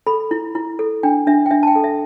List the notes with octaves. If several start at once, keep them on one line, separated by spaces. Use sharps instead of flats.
A4 B5
E4
E4
A4
D4 G5
D4 E5
G5
D4 E5
A5
G5
A4
E5